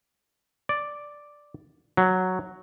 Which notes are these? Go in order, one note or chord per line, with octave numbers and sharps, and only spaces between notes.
D5
F#3